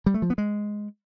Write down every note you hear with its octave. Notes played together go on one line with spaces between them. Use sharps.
G3
A3
F3
B3
G#3